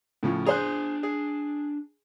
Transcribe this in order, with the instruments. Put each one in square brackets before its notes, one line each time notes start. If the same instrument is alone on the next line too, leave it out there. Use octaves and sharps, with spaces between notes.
[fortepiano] A2 C#3 F3
[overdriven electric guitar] D4 A#5 [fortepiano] G#4 C5 F#6
[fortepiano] G#4